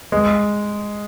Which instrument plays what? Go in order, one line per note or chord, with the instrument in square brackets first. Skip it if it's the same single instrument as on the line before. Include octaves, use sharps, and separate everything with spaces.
[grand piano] G#3